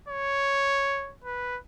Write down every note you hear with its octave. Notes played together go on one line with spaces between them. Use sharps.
C#5
B4